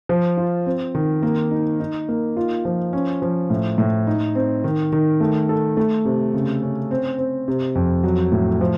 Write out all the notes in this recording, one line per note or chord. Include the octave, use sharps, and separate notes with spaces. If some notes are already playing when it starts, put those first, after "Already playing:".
F3
F4
C4
D#3
A#3
D#4
D#4
A#3
F4
F3
C#4
F3
A2
A2
D#4
C4
D#3
D#3
A3
A4
A3
C3
C#3
C#4
C4
C4
C3
F2
F#3
A2
F3